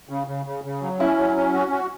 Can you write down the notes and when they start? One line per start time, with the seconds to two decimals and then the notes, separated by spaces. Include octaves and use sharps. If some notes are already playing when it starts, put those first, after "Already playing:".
0.09 C#3
0.27 C#3
0.46 C#3
0.64 C#3
0.82 F#3
1.00 C#4 E4
1.18 F#3
1.36 C#4
1.53 F#4
1.72 F#4